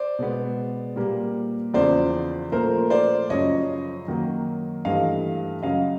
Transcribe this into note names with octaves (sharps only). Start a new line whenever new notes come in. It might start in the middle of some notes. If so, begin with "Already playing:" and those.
Already playing: C5 D5
B2 G#3 B3
A#2 G3 A#3
E2 C#3 F3 C5 D5
A#2 F3 A3 A#4 C5
C5 D5
F#2 C#3 F3 C#5 D#5
F#2 D#3 F#3 A#3
G2 E3 A3 D#5 F5
F#2 C#3 F#3 D#5 F5